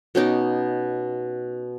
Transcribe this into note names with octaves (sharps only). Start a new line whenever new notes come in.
B2 C#4 D#4 D6